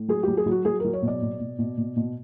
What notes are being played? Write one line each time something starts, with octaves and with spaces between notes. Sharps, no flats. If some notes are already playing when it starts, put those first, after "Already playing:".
Already playing: A2
F#3 G#4
F#3 G4
G#4
F#3
F#4
F#3 G#4
F#3 A#4
C#5
B2
D5
B2
B2
B2
B2
B2